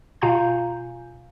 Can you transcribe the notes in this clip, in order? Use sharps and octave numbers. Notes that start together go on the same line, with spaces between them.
B2 F4 F5 G#5 A#5 G6